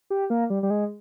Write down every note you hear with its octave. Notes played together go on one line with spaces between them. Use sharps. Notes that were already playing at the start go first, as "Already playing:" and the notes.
G4
A#3
G3
G3
G#3